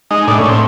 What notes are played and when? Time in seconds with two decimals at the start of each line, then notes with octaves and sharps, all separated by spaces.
0.11 G#3 D#4
0.27 A2 D4
0.38 C#4
0.44 A2 C4